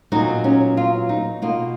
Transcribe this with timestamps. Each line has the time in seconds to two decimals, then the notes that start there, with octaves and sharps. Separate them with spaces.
0.12 A#2 F#3 B3 D#4
0.44 C#4
0.77 F4
1.09 D#4
1.42 B2 A#3 F4